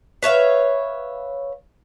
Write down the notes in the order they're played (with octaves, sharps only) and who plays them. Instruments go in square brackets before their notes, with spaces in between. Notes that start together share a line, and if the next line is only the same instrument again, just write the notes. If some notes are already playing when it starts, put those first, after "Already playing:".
[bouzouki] B4 C#5 E5 F5